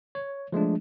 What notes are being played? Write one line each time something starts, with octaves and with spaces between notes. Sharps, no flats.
C#5
F3 G#3 A3 D4